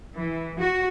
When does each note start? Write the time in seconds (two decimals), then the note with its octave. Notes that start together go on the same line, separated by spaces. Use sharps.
0.17 E3
0.60 F#4